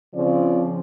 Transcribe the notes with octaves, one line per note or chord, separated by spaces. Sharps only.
C#3 F3 C4 D5